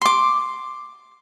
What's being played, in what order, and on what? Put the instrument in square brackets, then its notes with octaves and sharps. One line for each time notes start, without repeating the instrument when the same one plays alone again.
[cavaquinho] C6 D6